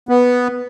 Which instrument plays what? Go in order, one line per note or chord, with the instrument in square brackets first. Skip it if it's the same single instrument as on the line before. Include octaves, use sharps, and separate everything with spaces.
[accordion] B3